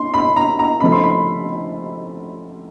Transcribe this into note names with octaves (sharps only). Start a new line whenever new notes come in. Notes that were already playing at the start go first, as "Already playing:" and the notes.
Already playing: C6
B5
A#5
A#5
C#3 F3 A3 B5
C6
B5